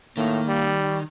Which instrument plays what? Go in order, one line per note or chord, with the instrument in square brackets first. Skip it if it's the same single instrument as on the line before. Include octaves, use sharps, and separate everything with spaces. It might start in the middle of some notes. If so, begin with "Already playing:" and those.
[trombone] A2 [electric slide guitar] D#3 [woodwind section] A#3
[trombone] G3